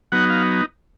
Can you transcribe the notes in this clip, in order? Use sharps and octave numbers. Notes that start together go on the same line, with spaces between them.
F#3 B3 D#4 F#5
F5